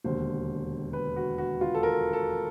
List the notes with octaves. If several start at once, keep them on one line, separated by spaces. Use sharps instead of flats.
E1 D#2 D3 C5
B4
F#4
F#4
F4
A4
A#4
A4